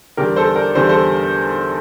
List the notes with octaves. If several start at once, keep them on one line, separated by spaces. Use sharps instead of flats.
E2 D3 G3 G4 A#4
A4 C5
A#4 D5
E2 D3 G3 A4 C5
A4 C5